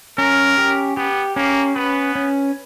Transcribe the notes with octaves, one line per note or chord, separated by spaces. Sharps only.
C#4 A#4
G4
B3 G4
A#3 C#4
B3 B4
C#4